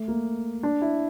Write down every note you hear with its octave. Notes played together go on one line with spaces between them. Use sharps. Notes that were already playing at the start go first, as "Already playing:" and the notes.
Already playing: A3
A#3
D4
E4